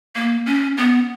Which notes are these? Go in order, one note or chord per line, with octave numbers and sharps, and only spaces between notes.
A#3
C#4
B3